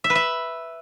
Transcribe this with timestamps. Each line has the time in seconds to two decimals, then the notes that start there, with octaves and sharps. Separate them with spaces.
0.04 E5
0.10 B4
0.15 E5